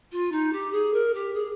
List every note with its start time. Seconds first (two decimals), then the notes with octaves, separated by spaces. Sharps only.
0.12 F4
0.32 D#4
0.53 G4
0.72 G#4
0.93 A#4
1.14 G4
1.34 G#4